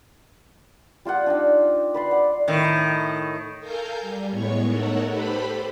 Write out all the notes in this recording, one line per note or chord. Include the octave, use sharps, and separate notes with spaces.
G3 F4 G4 F#5
D4 D#4 G5
B4 D5 C6
F#5
A2 D#3
A4 A#4 F5 G#5 A#5 G6
G3
A2 G#3 B3 C#5 C#6
A3 D#4 A4 A#4 C#5 F#5
G4 A4 B4 C5 B5